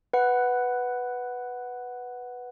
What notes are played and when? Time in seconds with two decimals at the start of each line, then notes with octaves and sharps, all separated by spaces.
0.13 B4 F#5